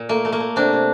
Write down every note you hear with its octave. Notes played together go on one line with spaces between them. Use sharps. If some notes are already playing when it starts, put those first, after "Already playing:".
Already playing: A#2
A3 A#3
A3
A#3
A3
C3 D4
C3